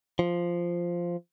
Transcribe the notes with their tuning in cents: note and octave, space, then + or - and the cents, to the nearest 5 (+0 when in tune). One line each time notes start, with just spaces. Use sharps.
F3 -5